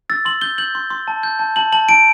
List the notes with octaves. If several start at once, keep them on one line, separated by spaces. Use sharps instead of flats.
E6 A6
C6 F#7
G6 G7
G6 F#7
C6
C6
A5
G6
A5
A5 F#7
A5 F#7
A5 D7